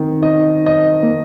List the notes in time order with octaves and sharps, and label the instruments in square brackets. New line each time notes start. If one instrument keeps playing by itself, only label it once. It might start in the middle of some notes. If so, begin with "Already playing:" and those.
Already playing: [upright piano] D#3 [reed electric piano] C4 D#4
[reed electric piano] D#4 [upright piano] D#5
[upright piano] D#5
[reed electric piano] A#3